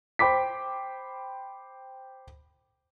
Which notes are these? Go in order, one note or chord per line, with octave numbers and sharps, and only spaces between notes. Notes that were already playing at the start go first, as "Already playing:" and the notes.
C5 G5 B5 D6 B6